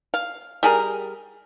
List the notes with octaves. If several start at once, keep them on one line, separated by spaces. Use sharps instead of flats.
F5
G3 G#4 A#4